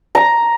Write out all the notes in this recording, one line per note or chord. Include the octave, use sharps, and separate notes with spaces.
A#5